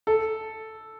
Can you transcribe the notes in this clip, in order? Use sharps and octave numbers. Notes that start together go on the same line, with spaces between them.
A4